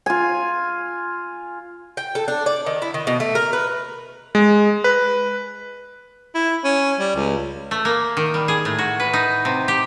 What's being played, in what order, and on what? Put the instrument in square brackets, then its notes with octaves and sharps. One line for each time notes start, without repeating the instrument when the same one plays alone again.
[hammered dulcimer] F4 G#5
[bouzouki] G5
A4
D4
D5
D#3
E4
D#3
B2
A3
A#4
B4
[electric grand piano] G#3
B4
[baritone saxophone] E4
C#4
G3
C#2
[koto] A3
A#3
D#3
G3
G#4
A2
F#4
B4
D#4
C3
G4